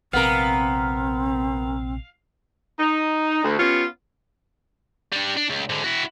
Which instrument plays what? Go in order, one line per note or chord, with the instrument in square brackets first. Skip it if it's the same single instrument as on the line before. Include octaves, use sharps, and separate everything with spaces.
[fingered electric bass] A#1 C3 [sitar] B3 A#4 [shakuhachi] C4 [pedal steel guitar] F5
[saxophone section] D#4
D2
B3 C#4 F4 G4 C#5
[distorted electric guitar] G3 D4
D4
C#2
G#2 D3
E4 F#4